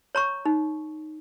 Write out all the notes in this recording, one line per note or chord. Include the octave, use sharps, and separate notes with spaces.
C#5 A#5 C#6
D#4